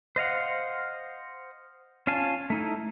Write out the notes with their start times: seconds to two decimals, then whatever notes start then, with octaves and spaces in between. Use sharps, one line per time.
0.16 C5 D#5 F5 F#5
2.07 C#4 F4 F5 G#5 A5
2.50 A3 D#4 E4